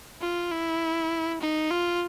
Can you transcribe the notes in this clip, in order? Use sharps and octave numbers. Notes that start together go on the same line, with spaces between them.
F4
E4
D#4
F4